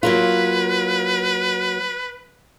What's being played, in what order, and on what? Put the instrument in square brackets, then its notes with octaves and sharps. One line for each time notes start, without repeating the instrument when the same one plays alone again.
[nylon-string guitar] F#3 A#3 F4 [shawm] B4